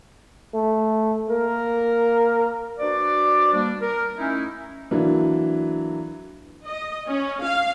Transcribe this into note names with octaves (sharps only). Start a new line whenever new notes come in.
A3
A#3 A#4
D4 F#4 B4 C5 D5
G3 A#3 D4
A#4
A3 C#4 D#4 E4
E3 F#3 A#3 D4
D#5
C#4
F5